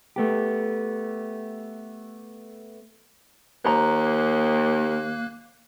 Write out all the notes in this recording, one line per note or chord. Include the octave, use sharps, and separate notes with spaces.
A3 B3 G4
D#2 A#3 C5 A#5 F#6